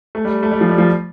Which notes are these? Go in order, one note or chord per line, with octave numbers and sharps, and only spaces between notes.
A3
G3
A3
G3
F3
G3
F3